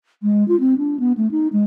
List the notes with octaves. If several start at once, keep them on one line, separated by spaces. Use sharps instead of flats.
G#3
F4
C4
D4
B3
A3
D#4
G#3